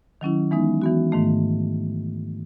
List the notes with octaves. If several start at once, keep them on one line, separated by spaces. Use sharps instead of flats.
D#3 F#3 C#4 E4
E3 G#3 B3 D#4
E3 B3 F#4
G#2 D#3 A3